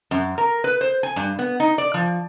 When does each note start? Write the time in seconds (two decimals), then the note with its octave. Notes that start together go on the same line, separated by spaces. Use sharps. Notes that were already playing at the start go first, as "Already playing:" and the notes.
0.11 F#2
0.38 A#4
0.64 B4
0.81 C5
1.03 G#5
1.16 G2
1.39 B3
1.60 D#4
1.78 D5
1.94 F3